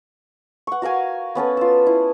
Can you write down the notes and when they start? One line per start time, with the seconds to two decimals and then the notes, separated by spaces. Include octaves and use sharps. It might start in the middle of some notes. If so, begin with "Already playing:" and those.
0.67 F#5 C#6
0.82 F#4 A#4 F5 G#5
1.35 B3 C#4 A4 B4
1.57 F4 E6
1.87 E4